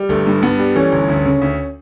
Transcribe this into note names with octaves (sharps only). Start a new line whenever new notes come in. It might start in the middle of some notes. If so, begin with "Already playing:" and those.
Already playing: G3
G1 A3
G2
G2 B3
G3
E3 A3 C#4
G1
D2
C#3
D2